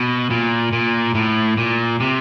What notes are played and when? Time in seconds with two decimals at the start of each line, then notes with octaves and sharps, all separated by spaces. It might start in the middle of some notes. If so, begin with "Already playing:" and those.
Already playing: B2
0.30 A#2
0.72 A#2
1.15 A2
1.57 A#2
2.00 C3